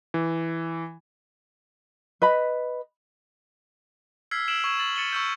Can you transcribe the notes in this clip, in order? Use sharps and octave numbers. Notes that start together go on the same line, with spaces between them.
E3
B4 D#5 B5
E6 F6 G#6 B6 C7
E6 D7 E7 F#7
C#6 G#6 E7
A6 F#7
A6 C#7 D#7 E7 G7
C#6 E6 G6